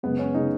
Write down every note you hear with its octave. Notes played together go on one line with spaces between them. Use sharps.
F#2 C#3 G#3 B3
C#4
C#3 G#3 D#4